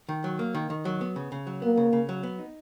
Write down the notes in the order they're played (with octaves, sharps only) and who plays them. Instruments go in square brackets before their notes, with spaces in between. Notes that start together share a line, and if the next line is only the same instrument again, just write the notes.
[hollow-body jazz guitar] D#3
F#3
A#3
D#3
D#3
F#3
B3
C#3
C#3
F#3
[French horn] A#3 [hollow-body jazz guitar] B3
[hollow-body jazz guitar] C#3
C#3
F#3
B3
D#4